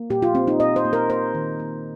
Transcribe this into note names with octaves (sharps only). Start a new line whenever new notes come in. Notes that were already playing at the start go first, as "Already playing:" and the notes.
Already playing: A#3
A#2 G4
F4
A#3 C4
D#4
A#2 D#5
C5
A#3
A#4
A#3 C5
D#3
A#3